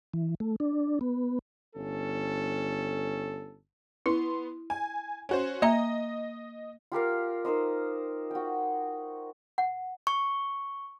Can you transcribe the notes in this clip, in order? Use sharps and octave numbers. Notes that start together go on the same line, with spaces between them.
E3
A3
D4
B3
G1 C#4 A4
B3 E4 C6
G#5
C#4 F#4 C5
A#3 D#5 E5 A#5
F4 G4 A#4 F5
D#4 A#4 C5 D#5
F#4 G5
F#5
C#6